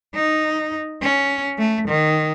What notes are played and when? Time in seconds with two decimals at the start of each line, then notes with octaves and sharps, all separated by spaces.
0.14 D#4
1.02 C#4
1.58 A3
1.88 D#3